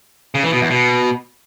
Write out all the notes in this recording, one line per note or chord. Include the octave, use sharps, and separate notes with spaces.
C#3
E3
B2
E2
B2